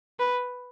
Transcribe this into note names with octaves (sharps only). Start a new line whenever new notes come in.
B4